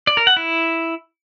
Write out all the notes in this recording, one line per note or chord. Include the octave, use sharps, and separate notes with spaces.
D5
A#4
F#5
E4